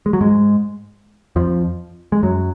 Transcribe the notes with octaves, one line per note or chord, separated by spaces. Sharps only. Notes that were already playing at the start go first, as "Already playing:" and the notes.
G#3
F#3
G#2 G#3
F2 F3
G#3
F#2 F#3